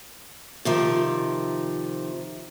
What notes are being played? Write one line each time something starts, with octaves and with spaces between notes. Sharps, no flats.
C3 D#3 F3